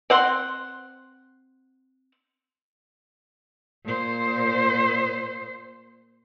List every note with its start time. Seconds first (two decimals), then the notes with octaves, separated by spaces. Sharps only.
0.10 C4 F#5 C6
3.85 A#2 C5